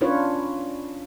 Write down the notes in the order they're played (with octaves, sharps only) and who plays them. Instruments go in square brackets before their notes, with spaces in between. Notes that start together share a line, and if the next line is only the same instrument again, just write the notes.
[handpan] C#4 D4 F4 B4 C#5